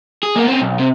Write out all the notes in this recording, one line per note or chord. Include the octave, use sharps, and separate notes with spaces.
G#4
A#3 B3
C4 C#4
B1
C3